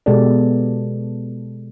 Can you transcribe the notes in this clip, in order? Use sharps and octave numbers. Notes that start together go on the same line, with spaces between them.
B2 G#3 B3 G4 A4 D5